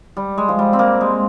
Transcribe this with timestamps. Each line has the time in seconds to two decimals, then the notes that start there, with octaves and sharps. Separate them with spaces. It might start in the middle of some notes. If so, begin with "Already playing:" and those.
0.17 G3
0.38 G#3
0.48 F3
0.59 G3
0.73 C4
0.79 A#3
1.01 G#3